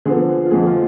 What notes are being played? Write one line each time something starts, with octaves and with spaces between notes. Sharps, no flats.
D3 F3 B3 G#4
F4
F2 D3 G#3 G#4
F4